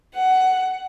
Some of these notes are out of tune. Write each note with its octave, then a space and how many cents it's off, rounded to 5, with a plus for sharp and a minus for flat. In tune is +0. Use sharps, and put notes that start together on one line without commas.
F#5 +15